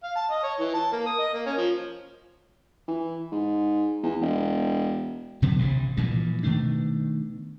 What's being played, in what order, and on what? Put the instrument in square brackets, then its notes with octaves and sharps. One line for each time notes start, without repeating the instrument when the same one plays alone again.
[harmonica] F5
A5
D#5
C#5
E3
A5
A#3
D#6
D#5
A#3
C#4
F3
[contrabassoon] E3
G#2
E2
E1
[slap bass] B2 D3 F#3 B3
A1 G2 C3
G2 A#2 E3 F3
B2 D#3 A3 D4